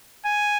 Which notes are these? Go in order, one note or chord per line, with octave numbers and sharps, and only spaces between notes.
G#5